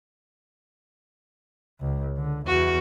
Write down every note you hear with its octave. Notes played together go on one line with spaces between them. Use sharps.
C#2
D3
E2 F#4